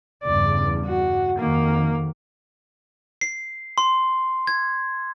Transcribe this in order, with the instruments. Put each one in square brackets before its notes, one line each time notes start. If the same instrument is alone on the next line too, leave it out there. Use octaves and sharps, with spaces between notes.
[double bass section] E2 G2 C#3 [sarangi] D5
[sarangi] F#4
[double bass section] F2 D#3 [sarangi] A#3
[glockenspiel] C7
C6
G#6